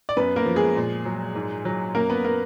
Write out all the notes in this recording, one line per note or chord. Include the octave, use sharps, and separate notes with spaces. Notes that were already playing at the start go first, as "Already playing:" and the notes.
D5
F#2 B3 B4
A#3 A#4
F3
G#3 G#4
A#2
F#3
G#2
F#3
F#2 A#3 A#4
B3 B4
A#3 A#4